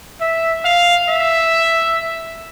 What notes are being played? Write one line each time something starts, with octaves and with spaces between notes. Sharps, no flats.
E5
F5
E5